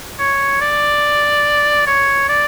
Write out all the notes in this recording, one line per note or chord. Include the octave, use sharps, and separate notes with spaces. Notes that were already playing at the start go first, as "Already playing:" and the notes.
C#5
D5
C#5
D5